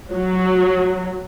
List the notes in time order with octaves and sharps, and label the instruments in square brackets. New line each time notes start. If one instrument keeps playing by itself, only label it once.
[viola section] F#3